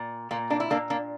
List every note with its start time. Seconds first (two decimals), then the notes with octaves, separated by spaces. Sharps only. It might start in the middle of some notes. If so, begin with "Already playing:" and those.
Already playing: A#2
0.31 A#2 A#3
0.50 A#3 D4
0.60 E4
0.70 A#2 A#3 D4
0.90 A#3 D4